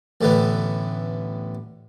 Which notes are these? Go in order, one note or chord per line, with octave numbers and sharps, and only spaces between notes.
A1 A2 D3 B3